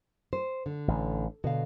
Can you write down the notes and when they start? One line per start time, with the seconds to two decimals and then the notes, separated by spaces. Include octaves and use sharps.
0.33 C5
0.66 D3
0.88 A1
1.44 B2 D3 F5